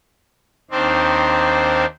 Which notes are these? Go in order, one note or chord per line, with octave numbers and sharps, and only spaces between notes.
D#2 D#3 C4 D4 D#4 C5